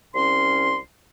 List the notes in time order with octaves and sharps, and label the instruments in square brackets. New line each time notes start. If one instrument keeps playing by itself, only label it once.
[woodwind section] C2 C#4 C6